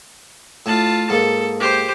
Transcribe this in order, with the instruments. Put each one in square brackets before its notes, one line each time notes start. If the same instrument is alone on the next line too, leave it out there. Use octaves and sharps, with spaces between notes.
[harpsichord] A2 [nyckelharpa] F4 A5
[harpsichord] G#2 A#3 [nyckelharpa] A4
[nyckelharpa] G4 C5